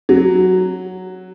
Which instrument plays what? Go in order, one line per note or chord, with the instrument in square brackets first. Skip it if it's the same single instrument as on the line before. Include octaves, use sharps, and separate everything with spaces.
[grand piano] F#3